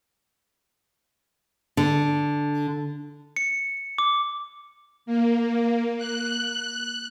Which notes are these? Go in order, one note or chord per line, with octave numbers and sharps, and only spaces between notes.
D3
C#7
D6
A#3
F#6